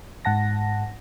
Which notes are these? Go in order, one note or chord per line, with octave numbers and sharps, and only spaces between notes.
G#2 F#5 A5 A#6